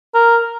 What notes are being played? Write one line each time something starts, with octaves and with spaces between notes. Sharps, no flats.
A#4